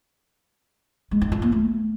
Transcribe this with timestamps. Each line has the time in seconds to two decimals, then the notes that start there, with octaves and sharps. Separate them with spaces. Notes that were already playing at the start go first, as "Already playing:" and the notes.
1.11 G#3
1.22 D#4
1.32 F4
1.42 A#3
1.52 A3